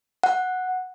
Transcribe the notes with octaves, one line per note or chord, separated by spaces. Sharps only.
F#5